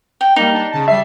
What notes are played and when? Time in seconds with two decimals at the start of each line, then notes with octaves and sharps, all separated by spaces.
0.21 G5
0.36 G3 A#3 D#4
0.53 D4
0.70 C#3 A5
0.88 G3 E5 C7